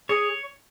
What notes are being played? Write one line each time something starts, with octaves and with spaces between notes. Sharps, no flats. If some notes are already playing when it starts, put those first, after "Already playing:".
G#4 C#5